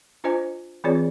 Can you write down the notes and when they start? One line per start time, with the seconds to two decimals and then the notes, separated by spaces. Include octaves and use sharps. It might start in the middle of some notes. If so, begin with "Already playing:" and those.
0.24 D4 F4 C5 D#5 G#5
0.84 E3 C4 F4 G#4 C#5 D5